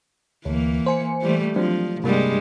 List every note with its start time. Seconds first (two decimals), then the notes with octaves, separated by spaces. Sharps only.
0.45 D2 E3 A#3
0.86 C5 G#5 C#7
1.21 E3 G3 A3
1.56 F3 F#3 C4 D4
2.04 G2 C3 G3 G#3 A#3